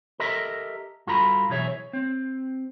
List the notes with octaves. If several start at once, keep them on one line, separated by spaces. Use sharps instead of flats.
G4 A4 A#4 D#5 E5
G2 F4 F#4 A4 A#5 B5
B1 B2 E3 G#4 C#5 E5
C#5
C4